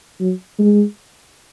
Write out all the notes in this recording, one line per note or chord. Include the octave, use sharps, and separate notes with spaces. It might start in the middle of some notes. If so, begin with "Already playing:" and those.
F#3
G#3